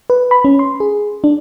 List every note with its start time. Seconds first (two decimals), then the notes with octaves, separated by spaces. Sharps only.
0.10 B4
0.31 B5
0.45 C#4
0.59 C6
0.80 G#4
1.24 D4